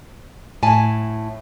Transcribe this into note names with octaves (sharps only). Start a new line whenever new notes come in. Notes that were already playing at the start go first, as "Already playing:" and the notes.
A2 G#5 A5